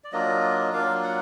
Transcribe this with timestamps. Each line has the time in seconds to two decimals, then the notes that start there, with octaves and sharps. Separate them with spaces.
0.04 D5
0.12 F#3 A#3 D4 F4 D#5
0.73 F#3 A#3 D4 F4 F5
1.04 F#5